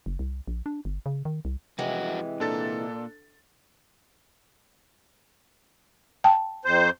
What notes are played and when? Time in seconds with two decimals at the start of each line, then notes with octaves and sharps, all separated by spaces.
0.06 F#1
0.19 C2
0.47 A#1
0.66 D4
0.85 G1
1.06 C#3
1.25 D#3
1.45 C2
1.79 F2 C3 E3 G#3 F#4
2.40 A#2 D4 A4 A6
6.24 G5 A5
6.65 F2 C5